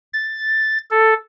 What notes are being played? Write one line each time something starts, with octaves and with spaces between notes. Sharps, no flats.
A6
A4